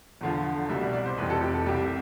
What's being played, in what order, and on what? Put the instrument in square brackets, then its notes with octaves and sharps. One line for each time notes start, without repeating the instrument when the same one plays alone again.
[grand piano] E2 D3 F3
C2 B2 G3 E5
D5
D5
C5
F1 F2 E3 G3 B4
A4
G4
A4
C2 C3 G3 G4